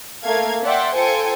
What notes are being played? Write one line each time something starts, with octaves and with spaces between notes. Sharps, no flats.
A3 A#3 F5 G#6
D5 E5 F#5 G5 C6
F4 A4 C5 G5 G#5 C#7